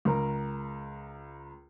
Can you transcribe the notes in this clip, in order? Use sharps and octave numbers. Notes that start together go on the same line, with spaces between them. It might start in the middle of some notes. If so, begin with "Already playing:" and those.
C#2 A#4